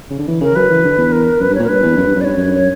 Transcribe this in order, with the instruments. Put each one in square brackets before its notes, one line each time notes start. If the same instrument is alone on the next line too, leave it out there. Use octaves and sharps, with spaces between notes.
[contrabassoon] C#3
D3
E3
[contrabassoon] C#3 [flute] A#4
[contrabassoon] F#3 [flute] B4
[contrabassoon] E3
D3
E2
[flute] A#4
[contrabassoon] F#2 [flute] B4
[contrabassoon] G2
[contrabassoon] A#2 [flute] C#5
[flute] A#4
[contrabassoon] G2 [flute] B4
[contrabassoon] E2
F#2
G2
[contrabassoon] F#2 [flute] D5
[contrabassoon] G2 [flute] C#5
[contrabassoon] F#2
[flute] C#5